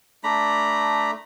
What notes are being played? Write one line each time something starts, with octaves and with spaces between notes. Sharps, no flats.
A3 D4 A#5 B5